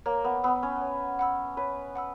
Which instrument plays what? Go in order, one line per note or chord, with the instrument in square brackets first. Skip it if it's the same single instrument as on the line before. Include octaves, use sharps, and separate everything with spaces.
[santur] A#3 [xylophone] C#5
[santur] B3
[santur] B3 [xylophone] F#5 B5 E6
[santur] C#4
[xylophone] C#5
F#5 B5 E6
[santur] B4 [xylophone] C#5
[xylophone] F#5 B5 E6